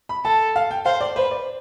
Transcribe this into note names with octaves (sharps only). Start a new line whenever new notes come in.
B5
A4 A5
F5
G5
C5 F5
D5
B4 C5
D5